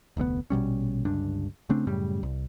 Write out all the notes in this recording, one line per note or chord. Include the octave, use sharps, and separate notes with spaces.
F1 D2 B2 B3
A#1 B2 G3 C#4
G1 C#2 G2 D4
C#3 A3 C4 D4
F#2 A2 C#3 G3
C2